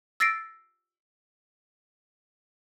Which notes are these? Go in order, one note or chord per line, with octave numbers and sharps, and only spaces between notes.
E6 A6 A#6 C7 D7